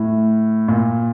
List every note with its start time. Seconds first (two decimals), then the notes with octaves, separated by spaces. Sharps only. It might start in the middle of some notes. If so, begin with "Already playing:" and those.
Already playing: A2
0.68 A#2